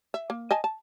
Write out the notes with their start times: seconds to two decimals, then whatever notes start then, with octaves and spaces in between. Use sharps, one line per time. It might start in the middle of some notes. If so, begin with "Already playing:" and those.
0.14 E5
0.30 A#3
0.51 D#5 G#5 A5
0.64 A5